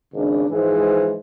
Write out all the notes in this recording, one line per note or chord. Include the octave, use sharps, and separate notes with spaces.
G#1 C#3 D4
G#2 E3 F3 G#3